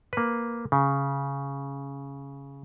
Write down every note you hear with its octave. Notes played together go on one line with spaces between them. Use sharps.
A#3 B4
C#3